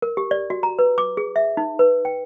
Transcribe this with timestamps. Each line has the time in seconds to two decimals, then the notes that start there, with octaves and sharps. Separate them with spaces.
0.02 A#4
0.17 G4
0.31 D5
0.50 F#4
0.63 A#5
0.79 B4
0.98 D6
1.17 G#4
1.36 E5
1.57 D#4
1.79 B4
2.05 G5